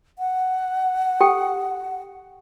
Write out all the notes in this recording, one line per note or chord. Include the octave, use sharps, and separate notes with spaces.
F#5
G4 A4 G5